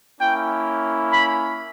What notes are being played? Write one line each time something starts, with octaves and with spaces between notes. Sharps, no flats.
A#3 C#4 E4 G5
B5